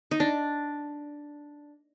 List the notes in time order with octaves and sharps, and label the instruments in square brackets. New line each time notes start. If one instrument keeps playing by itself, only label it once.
[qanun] D#4
D4